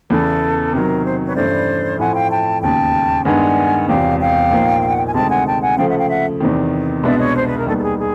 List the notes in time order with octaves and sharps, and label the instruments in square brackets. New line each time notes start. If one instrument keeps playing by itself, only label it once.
[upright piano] E2 C#3 E3 [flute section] A4
[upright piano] C3 D#3 F#3 [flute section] A#4
[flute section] C5
B4 C#5
[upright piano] G2 E3 A3 C#4 E4 [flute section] C5 D5
[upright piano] A2 F3 A3 C4 E4 [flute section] F#5 G#5
[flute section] F5 G5
G5 A5
[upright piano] E1 D#2 C#3 [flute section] G5 A5
[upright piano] G2 D#3 G#3 B3 D4 [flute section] F#5 G#5
[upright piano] E1 E2 C3 [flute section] F5 G5
[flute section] F5 G5
[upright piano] A#1 A#2 F3 A#3 D#4
[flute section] F5
F#5
G5
G#5
[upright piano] D2 C3 D#3 G#3 [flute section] G5 A5
[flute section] F#5 G#5
G5 A5
F#5 G#5
[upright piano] C#3 F3 A3 [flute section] F5 G5
[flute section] E5 F#5
F5 G5
E5 F#5
[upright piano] E2 C3 D#3
[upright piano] C2 B2 G#3 B3 D4 [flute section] D5 E5
[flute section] C#5 D#5
C5
B4
A#4
[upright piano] D#2 D#3 G3 B3 [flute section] A4
[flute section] A4
G#4
G#4